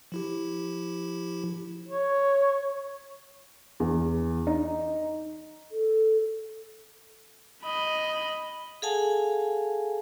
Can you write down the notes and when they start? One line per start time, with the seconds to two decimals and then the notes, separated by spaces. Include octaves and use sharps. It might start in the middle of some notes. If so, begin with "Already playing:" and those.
0.12 F3 E4 G4
1.88 C#5
3.80 E2
4.47 D#4
5.72 A4
7.64 D#5 B5
8.82 G#4 A4 F5 F#5 G#5 A5